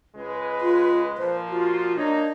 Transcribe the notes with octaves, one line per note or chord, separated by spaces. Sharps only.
C#2 G#3 B4
F4
A#2 F3 C5
F4 F#4
A#3 D4 D#4 C#5